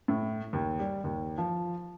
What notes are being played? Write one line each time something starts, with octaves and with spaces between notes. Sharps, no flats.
A2
D#2
G3
D#2
F3